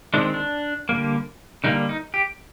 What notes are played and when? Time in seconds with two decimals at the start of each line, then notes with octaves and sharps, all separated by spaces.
0.14 D#3 G#3 C4 D4
0.34 D4
0.89 D3 G3 A#3
1.64 D3 G3 A#3 D#4
1.89 D#4
2.14 G4